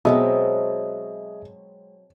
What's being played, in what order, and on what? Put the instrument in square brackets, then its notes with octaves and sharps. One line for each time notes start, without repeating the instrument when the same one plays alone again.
[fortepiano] B2 [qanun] F#3 G#3 C4 [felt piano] G#4 [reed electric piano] D#5 E5 D#6